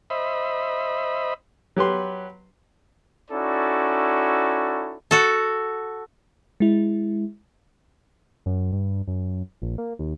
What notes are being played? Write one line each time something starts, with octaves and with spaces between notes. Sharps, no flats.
C5 D#5 E5 B5
F#3 G4 B4 C6
C#4 D#4 E4 F#4 A4 D5
F#4 A4
G#3 E4
F#2
G2
F#2
A#1
A#3
D#2